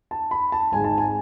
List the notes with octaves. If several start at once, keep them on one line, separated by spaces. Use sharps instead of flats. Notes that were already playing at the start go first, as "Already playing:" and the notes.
A5
B5
A5
G#1 G#2 G#3 G#5
A5
G#5